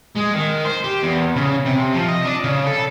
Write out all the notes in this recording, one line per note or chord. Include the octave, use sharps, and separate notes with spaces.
G#3
D#3
C5
G4
E2
C#3
C3
F3
D#5
D4
C#3
A4